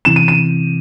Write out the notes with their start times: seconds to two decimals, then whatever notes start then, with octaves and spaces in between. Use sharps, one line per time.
0.05 C3 E3 E7
0.16 D#7
0.28 D#7